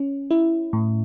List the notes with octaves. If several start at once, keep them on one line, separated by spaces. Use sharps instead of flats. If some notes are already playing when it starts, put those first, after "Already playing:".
Already playing: C#4
E4
A2